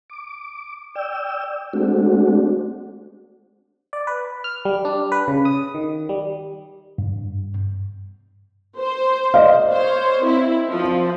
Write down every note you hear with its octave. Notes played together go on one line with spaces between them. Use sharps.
D6
D5 G5 E6
G#3 A3 C4 D4 F#4
D5
B4
F6
G3
D4
B4
C#3
D#6
D#3
G3
G2
C5
D5 D#5 F5
C5 C#5
C4 E4
F3 C4